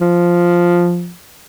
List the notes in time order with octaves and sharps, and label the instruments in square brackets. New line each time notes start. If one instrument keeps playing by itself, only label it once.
[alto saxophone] F3